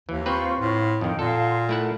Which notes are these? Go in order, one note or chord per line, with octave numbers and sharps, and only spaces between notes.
D#2 E3
C4 F4 B4 C5 C#6
A2 F4
F2 D#3 G5
A#2 A4 F5 F#5 C6
A3 E4 A#4 F#5